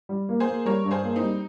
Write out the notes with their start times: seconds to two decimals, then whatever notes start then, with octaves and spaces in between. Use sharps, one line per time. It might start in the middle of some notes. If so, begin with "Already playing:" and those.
0.09 G3
0.29 A#3
0.40 G#4 C5
0.47 A#3
0.65 G3 A#4 C#5
0.85 G2
0.91 G#4 C5
1.03 A#3
1.16 C4 D#4
1.22 G3